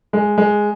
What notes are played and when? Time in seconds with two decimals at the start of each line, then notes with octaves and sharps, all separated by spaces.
0.13 G#3
0.38 G#3